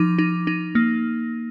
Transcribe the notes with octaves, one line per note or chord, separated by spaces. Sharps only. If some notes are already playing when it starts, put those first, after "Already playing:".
Already playing: F3 D#4 D6
D#4
D#4
A#3